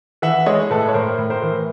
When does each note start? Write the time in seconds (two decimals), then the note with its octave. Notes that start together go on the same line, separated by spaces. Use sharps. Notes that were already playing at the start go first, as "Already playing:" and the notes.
0.22 E3 E5 F#5
0.46 G#3 C#5 D#5
0.70 A2 A4 B4
0.89 C#5
0.94 A2 A#4 C5
1.18 A2
1.30 A#4 C5
1.42 E3